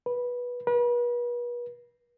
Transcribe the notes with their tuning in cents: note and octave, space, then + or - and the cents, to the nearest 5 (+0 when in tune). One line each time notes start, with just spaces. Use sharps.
B4 -15
B4 -40